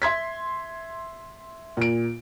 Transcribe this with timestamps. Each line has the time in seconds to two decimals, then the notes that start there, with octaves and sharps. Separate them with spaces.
0.02 E5 C6 G#6 B6
1.77 A#2 D7